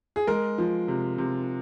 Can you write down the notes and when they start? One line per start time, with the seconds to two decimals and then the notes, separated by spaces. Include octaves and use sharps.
0.16 G#4
0.27 G#3 A#4
0.58 F3
0.88 C3
1.18 C3